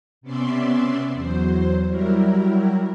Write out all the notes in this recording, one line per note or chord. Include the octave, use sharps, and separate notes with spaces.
C3 B3 C#4 D5 E5 C6
E2 F#3 C5
F#3 G3 E4 A#4